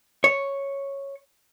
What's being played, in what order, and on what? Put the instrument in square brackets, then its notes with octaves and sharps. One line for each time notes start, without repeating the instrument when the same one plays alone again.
[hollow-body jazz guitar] C#5